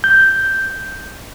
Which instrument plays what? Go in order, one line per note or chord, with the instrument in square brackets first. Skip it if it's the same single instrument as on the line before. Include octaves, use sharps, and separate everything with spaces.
[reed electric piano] G6